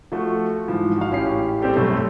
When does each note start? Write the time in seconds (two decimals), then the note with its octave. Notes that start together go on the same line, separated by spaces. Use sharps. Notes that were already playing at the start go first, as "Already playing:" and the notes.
0.12 F3 A3 F#4
0.68 G#2 E3 F3
0.97 F#4 F5
1.11 A1 C#4 G4 C7
1.62 G3 C4 C#4 G4 A4
1.76 F#2 B2 A3 C4